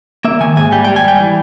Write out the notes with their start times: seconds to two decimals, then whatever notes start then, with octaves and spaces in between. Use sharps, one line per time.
0.25 A#3 E5
0.41 D#3 G#5
0.57 G#2 G#5
0.72 G3 G5
0.85 G5
0.88 G3
0.96 G#5
1.04 G3 G5
1.20 E3